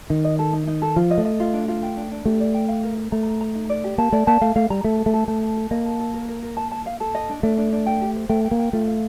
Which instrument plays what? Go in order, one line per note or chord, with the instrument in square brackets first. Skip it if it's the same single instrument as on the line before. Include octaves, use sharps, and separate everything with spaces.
[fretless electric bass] D#3 [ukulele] D#4
[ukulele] D#5
A4
D#4
D#4
A4
[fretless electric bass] F3 [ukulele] F4
[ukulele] D#5
[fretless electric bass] A3
[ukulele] D#5
F4
D4
F4
G5
D4
D4
[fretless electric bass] A3 [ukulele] G4
[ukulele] D5
G5
F5
A#4
A#4
[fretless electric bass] A3 [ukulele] A#5
[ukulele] A#5
A#5
D#4
D5
G4
[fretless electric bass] A#3 [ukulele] A5
[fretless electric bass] A3 [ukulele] D5
[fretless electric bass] A#3 [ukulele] A5
[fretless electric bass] A3 [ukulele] F5
[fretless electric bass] A3 [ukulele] F5
[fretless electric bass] G3 [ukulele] A#5
[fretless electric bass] A3 [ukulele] A4
[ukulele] A4
[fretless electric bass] A3
[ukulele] A4
[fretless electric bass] A3 [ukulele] A5
[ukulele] A5
A4
[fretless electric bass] A#3 [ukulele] D#5
[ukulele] A5
A4
A#4
A#4
A#4
A5
A5
F5
A4
D#5
D4
[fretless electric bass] A3 [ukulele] D4
[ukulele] D4
D4
G5
G4
C5
[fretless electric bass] A3 [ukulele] G5
[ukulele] G5
[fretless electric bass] A#3
[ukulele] G5
[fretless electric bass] A3 [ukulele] F4
[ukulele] F5